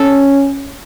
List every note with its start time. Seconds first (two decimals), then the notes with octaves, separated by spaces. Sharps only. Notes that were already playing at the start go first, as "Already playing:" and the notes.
Already playing: C#4 A4